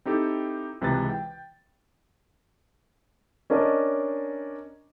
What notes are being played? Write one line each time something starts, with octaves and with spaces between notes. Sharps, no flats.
C4 D#4 E4 G4 A4
C#2 C3 E3 G#3 B4 A6
G5
C#4 D4 A#4 D#5 A5